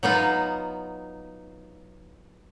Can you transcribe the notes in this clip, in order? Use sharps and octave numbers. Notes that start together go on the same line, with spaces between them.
F#3 B3 D#4 F4